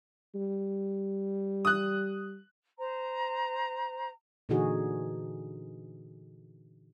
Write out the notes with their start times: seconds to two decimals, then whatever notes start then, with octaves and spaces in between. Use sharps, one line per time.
0.35 G3
1.65 D#6 F#6
2.78 C5 A#5
4.49 A#2 D3 E3 D#4 F#4 G#4